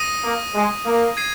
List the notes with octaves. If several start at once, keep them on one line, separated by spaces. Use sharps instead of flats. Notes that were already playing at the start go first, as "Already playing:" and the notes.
Already playing: D#6 A#6 D#7
A#3
G#3
A#3
G#6 C7 D#7